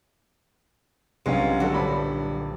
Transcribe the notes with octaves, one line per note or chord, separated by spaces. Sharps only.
B1 G2 C3 G#3 C#4 F4 D#5 G#5
D3 F#3 F#4 A4
D#1 D5 B5